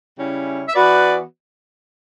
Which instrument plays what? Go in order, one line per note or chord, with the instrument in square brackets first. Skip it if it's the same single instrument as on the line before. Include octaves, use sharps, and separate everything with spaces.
[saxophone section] C#3 G3 C#4 E4
[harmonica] E5
[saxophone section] E3 B3 F#4 [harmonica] B4 D5